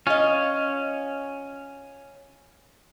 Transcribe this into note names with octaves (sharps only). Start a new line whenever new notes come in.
C#4 F4 D#5